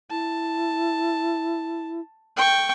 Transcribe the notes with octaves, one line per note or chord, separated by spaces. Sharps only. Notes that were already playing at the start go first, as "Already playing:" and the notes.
E4 A5
G5 C#6